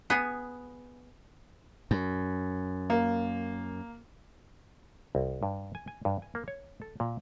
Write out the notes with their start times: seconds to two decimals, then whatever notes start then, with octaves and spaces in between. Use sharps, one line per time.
0.10 B3 G#4
1.91 F#2
2.90 A#3
5.15 C2
5.43 G2
5.75 G#5
5.88 G#5
6.05 G2
6.22 G#5
6.35 A#3
6.48 C#5
6.82 A4
7.00 A#2